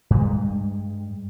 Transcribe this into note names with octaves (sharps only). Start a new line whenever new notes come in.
G2 G#3